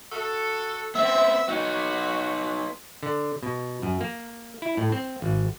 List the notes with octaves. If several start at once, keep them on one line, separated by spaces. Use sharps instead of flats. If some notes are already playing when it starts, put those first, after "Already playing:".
F#4 A4
B3 C4 E5
B3 D#4 F#4
D3
B2
F#2
A#3
E4
A2
C4
G#1